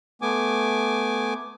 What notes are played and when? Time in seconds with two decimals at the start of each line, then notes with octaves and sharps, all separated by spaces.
0.22 A3 B3 G#5 D6